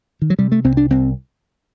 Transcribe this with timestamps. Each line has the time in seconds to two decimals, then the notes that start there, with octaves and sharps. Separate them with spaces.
0.22 D#3
0.30 F#3
0.39 C3 G3
0.52 A3
0.64 C2 C4
0.77 D4
0.90 C2 C4